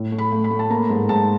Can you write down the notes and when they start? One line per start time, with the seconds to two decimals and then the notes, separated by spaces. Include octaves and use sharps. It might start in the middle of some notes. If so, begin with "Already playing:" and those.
Already playing: A2
0.12 A3
0.18 B5
0.32 A3
0.44 B5
0.51 A3
0.59 A5
0.70 A#3 A#5
0.89 G#2
1.09 G#2 A5